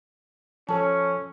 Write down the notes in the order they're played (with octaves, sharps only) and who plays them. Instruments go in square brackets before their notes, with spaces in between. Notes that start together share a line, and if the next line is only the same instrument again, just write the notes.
[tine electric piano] F3 A4 C#5 [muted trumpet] C#4 [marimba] A5